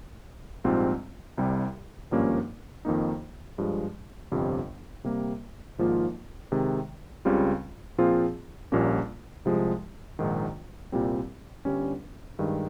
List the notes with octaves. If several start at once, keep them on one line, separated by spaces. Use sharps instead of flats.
A#1 G#2 G3 C4 F4
C2 C3 G3
G#1 G2 F3 A#3 C#4
F2 D#3 A#3 D#4
G2 F3 G#3
G1 F2 C3 G3
C3 G3 A#3
G#1 G#2 F3 A#3 F4
C3 D#3 G#3
C#2 C#3 G3 C4 F4
A#2 F3 C4 F4 G#4
A#1 A#2 G3 A#3 C#4
C2 C3 F3 G#3
A#1 G#2 D#3
C2 A#2 G3 C4
G1 G2 G3 C#4
G2 D#3 G#3